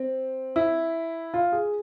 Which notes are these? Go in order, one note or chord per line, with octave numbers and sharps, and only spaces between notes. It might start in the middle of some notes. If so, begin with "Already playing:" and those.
Already playing: C4
E4
F4
G#4